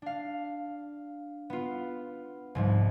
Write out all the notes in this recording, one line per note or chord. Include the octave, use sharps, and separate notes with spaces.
D4 F5
B3 F4
C2 G#2 F3